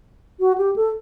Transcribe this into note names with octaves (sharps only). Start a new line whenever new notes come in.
F#4
G4
A4